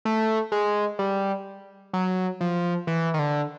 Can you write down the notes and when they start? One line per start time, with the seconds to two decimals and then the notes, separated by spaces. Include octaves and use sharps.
0.05 A3
0.52 G#3
0.99 G3
1.93 F#3
2.41 F3
2.87 E3
3.14 D#3
3.19 D3